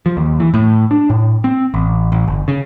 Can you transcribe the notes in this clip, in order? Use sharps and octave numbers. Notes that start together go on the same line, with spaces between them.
F3
D#2
E3
A2
D4
A2
C4
A1
A1
G1
C#3